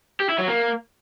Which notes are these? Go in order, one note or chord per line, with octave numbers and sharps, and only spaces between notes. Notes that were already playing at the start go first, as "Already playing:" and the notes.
G4
E4
F#3
A#3